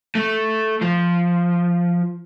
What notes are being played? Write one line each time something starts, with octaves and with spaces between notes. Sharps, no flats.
A3
F3